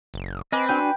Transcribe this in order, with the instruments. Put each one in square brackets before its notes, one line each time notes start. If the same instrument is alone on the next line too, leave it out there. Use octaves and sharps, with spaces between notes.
[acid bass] F#1
[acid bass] C4 [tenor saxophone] B4 [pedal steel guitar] D#5 G#5 D6
[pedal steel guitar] D4 F#4 G#5 [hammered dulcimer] G5